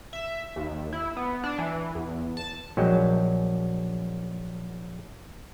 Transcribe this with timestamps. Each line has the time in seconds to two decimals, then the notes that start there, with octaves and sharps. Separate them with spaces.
0.13 E5
0.56 D#2
0.93 E4
1.17 B3
1.44 D4
1.59 E3
1.95 E2
2.37 A5
2.77 A#1 F#3 G#3 G5